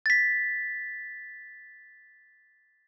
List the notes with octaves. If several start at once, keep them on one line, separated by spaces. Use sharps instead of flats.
A6 B6